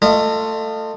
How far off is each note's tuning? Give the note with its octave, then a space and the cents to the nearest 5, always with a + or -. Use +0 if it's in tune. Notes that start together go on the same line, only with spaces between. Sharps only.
A3 +20 F4 +0 D#5 -20